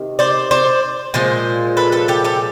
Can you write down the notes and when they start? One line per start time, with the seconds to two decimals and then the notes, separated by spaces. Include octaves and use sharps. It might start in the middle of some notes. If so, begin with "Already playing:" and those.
Already playing: C3 D#3
0.19 C5 D5
0.51 C5 D5
1.14 A#2 F3 G#3 C5
1.77 A4 B4
1.92 A4 B4
2.08 G4 A4
2.24 G4 A4